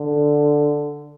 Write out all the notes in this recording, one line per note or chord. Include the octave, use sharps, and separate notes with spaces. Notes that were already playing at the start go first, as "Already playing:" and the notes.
Already playing: D3